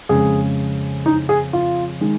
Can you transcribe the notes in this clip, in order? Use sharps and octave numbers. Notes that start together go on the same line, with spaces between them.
F2 C#3 G#3 G#4
D#4
G#4
F4
D#3 G#3